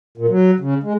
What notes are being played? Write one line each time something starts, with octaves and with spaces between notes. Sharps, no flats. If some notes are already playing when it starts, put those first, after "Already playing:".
A#2
F#3
C#3
G#3